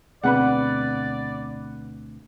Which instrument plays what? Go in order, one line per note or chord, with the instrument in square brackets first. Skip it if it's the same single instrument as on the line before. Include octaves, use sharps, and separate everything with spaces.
[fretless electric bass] D2 B2 C4 [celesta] G#4 B5 [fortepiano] B4 F#5 [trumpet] D5